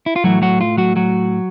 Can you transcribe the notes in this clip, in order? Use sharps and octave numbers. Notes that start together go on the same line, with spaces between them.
E4
F4
A2 E3 F#3 A3 F#4
F#3 F#4
F4
F#3 F#4
F#3 F#4